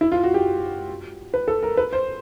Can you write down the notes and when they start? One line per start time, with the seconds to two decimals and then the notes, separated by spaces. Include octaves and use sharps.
0.01 E4
0.12 F4
0.24 F#4
0.34 G4
1.34 B4
1.48 A4
1.63 A#4
1.77 B4
1.93 C5